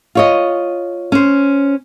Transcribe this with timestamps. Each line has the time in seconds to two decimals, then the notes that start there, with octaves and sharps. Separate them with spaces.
0.15 F4 C#5 D#5
1.12 C#4 C5